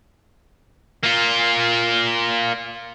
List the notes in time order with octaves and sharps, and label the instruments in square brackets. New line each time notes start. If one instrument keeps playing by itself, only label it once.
[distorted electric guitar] A#3 F4